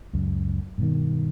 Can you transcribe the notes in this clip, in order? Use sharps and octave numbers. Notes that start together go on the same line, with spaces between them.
C#2 F#2
G2 B2 D#3